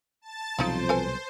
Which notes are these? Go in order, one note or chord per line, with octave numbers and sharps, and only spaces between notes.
A5 A6
C2 F2 B2 F#3 D#4 F4 C5
A4 B4 G#5